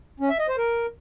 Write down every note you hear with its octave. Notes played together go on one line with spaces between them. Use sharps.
C#4
E5
D#5
C5
A#4